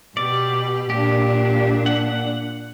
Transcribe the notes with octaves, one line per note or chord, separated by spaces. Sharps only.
B2 G4 D5
A#2 D4 G4
F#5